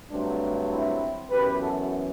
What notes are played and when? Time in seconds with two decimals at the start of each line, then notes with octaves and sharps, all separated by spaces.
0.11 G2 D3 F#3 A3 C4 D4
0.70 C4 E4
1.31 F#2 E3 B3 G4 B4
1.61 F#4 A4